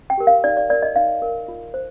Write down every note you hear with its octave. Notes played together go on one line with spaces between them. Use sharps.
G5
G4 A#4
F5
D#4 D5
D5
A#4 D5
D#5
D#4 F5
A#4
F4
C5